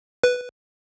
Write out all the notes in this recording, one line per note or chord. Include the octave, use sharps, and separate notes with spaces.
B4